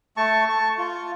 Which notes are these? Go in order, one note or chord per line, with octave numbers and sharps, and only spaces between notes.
A3 A5 C#6
A5 C#6
F4